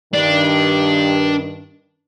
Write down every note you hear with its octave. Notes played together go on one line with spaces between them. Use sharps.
G2 D#3 D4